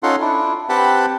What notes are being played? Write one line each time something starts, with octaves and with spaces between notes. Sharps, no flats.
C#4 D#4 F4 A4 F#5 C6
D4 E4
C4 G4 B4 F#5 A5 B5